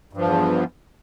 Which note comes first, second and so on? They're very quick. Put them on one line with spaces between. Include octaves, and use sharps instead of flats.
G2 F3 E2